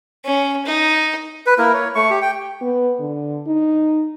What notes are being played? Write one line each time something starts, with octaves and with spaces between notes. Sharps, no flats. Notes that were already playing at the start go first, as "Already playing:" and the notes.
C#4
D#4
B4
A#3 E4 A#4
C#5
A3 C#6
G4
G5
B3
D3
D#4